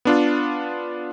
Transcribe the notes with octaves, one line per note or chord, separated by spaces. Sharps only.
B3 D4 F4